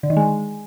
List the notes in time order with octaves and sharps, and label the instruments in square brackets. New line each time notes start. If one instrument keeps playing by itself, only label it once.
[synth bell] D3
D#3
G#3